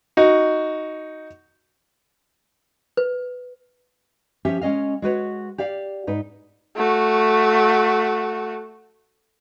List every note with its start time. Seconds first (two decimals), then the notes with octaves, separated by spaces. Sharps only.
0.17 D#4 F#4
2.97 B4
4.45 F3 C#4 G4 E5
4.61 G#3 C#4 D#5 F5
5.02 G#3 F#4 B4 C#5
5.58 G4 D5 F5
6.07 G#2 D#4 B4
6.76 A3 F#4